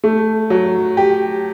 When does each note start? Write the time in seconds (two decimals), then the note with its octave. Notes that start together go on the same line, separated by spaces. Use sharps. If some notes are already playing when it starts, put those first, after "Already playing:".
0.04 A3
0.50 F#3
0.97 G4